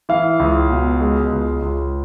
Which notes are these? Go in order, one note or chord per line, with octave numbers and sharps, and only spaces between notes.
E3 F5
C#2
B2
G#3
C#2
C#2